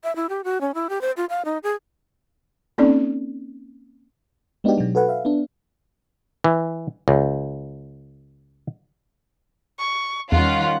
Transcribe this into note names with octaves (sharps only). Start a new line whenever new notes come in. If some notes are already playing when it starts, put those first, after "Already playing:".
E5
E4
G4
F#4
C#4
E4
G4
C5
F4
F5
D#4
G#4
A#3 C4 C#4 D#4 A4 D5
G#3 B3 D4 D#4 F#4 G4
B2 F#3
F#4 A4 B4 F#5
E5 F5
B3 D4
E3
C#2
C#6
E2 D#3 G3 C#4 F4 F#5